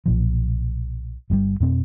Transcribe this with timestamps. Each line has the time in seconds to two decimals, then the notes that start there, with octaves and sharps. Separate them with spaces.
0.06 B1 A#2 F3
1.30 G1 G2 C3 G3
1.60 F2 B2 C4